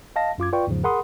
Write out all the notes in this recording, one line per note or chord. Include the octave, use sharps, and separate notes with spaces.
D#5 F5 A5 A#6
F#2 F4 D6 G#6
F4 B4 D5 G5 C#6
E2 G#2 C#3 F3
G#4 A#4 F#5 B5 C6 D#6